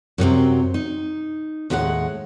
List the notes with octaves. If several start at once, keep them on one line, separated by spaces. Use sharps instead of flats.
F#2 C3 F#3 C4
D#4
D#2 A2 G#3 B4 F#5